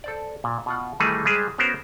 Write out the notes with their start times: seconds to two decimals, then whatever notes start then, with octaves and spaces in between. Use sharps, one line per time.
0.04 A4 C5 D5
0.44 A#2
0.66 B2 F4 F#5
1.00 D#3 E3 G3 A3 D#4 G#4
1.25 G3 G#3 G4 G#4 C5
1.58 B3 C#4 F#4 A#4 C5